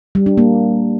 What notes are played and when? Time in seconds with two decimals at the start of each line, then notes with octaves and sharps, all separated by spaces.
0.15 G3
0.26 D4
0.37 A#3